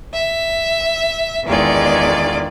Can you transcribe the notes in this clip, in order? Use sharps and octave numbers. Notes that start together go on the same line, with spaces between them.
E5
E2 D3 D#3 G#3 F4 D5